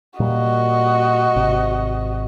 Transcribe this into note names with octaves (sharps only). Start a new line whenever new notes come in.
A#2 G3 A#3 F#4 D#5
G#1 C3